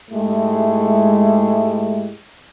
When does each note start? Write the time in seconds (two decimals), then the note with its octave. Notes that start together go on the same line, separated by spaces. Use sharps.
0.11 G#2 G#3 A3 E4 G4 G#4